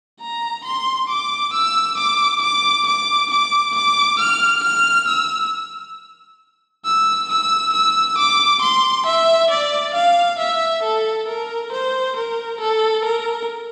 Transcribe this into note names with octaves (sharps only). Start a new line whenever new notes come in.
A#5
C6
D6
E6
D6
D6
D6
D6
D6
F6
F6
E6
E6
E6
E6
D6
C6
E5
D5
F5
E5
A4
A#4
C5
A#4
A4
A#4